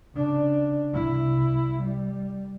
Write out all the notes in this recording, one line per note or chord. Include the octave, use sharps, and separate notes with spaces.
C#3 D4
C2 E4
G3